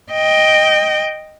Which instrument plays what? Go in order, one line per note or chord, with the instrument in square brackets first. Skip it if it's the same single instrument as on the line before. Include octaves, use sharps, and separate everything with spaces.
[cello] D#5 G5